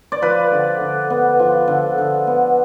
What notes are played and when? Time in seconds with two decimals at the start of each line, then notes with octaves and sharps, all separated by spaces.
0.12 D5
0.22 F3 B4
0.52 D3
0.81 D3
1.10 B3
1.39 F3
1.68 D3
1.98 D3
2.27 B3